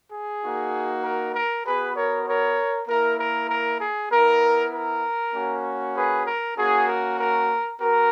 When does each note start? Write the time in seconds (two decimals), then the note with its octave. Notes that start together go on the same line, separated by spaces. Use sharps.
0.12 G#4
0.42 A#3 D#4 F#4
1.04 A#4
1.34 A#4
1.65 B3 F#4 G#4 B4
1.96 A#4 C#5
2.26 A#4 C#5
2.88 A#3 E4 A#4
3.19 A#4
3.49 A#4
3.81 G#4
4.11 B3 E4 A#4
4.73 A#4
5.34 A#3 C#4 F#4
5.95 G#4 B4
6.26 A#4
6.57 A#3 C#4 F#4 G#4
6.88 A#4
7.19 A#4
7.81 B3 F#4 A#4